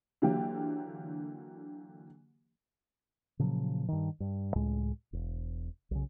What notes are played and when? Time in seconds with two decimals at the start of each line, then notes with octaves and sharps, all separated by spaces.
0.22 D3 E3 F#3 A#3 G4
3.39 A#2 C#3 F3 F#3
3.88 G2 D#3
4.20 G2
4.55 C#2 A2 G#3
5.13 E1
5.91 B1 C#3